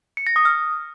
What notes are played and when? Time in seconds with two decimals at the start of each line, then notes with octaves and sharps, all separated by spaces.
0.17 C#7
0.27 A#6
0.36 D#6
0.45 F6